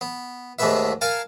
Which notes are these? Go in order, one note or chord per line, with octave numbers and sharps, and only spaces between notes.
B3
D#2 G#2 A3 B3 B4 E5
A#4 F5 G#5 A5